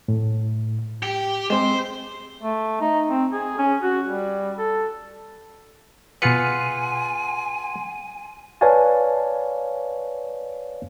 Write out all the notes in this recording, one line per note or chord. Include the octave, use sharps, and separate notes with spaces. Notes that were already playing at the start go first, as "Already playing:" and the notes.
A2
G4
G#3 C4 C5 C6
A3
D#4
C4
G#4
C#4
F#4
G3
A4
B2 F4 G#4 B4 F#5 G#5 C6 C#7
B4 C#5 D5 F5 G#5 A5